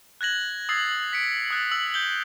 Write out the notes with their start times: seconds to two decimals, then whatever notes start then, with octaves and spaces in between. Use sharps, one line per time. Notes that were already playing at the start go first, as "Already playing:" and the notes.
0.21 F#6 G#6 A#6 F#7
0.69 D#6 E6 G#6 A6 C7
1.13 B6 C#7 D7
1.50 D#6 F#6 A6
1.71 E6 F#7
1.94 G6 F#7 G7